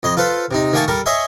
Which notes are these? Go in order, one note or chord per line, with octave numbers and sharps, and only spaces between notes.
F2 D#5 C6
F4 A4 B4 C5
C3 D#4
D#3 A3 A#3 G#5 A5 C#6
G3 A4 A#4
C#5 D#5 E5 G#5 C6